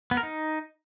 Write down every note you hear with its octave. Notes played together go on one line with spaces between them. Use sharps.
B3
A#4
D#4